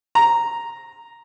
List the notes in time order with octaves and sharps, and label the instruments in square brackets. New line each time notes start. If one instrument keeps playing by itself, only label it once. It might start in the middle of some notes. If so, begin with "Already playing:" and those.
[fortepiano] A#5